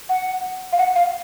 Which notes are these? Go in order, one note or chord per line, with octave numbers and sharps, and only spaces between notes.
F#5
F5
F#5
F5